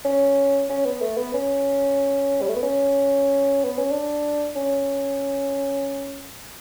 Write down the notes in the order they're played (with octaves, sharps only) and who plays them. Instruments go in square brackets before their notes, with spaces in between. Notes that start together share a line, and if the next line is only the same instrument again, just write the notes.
[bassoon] C#4
C#4
B3
A3
B3
C#4
G3
A3
B3
C#4
B3
C#4
D4
C#4